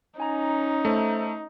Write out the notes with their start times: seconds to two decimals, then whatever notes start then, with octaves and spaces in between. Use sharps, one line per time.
0.20 C#4 D#4 G#5 A#5
0.85 A3 C5 E5 A#5